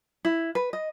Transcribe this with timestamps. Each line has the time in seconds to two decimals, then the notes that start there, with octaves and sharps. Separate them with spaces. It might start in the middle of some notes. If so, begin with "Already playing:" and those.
0.25 E4
0.55 B4
0.73 D#5